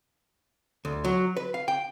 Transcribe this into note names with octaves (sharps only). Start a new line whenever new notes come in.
D2
F#3
B4
F5
G5